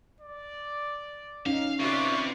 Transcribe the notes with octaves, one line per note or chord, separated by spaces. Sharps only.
D5
C#4 D#4 F5
C3 F4 B4 D5 C#6